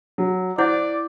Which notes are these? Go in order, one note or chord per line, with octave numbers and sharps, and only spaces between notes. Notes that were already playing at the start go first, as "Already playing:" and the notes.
F#3
E4 C5 D5 F#5 G6